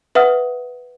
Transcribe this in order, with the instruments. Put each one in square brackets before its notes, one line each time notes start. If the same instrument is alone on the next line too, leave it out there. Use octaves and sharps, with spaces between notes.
[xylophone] B4 E5 F#5 D#6 F6